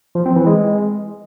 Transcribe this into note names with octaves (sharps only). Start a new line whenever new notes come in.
F3
C4
E3
G#3